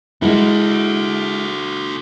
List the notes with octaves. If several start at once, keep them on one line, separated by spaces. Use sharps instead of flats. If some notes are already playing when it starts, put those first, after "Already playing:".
G#3 E4 F#4 A4